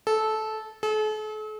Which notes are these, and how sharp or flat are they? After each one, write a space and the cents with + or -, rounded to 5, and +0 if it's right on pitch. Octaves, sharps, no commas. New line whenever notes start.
A4 -15
A4 -45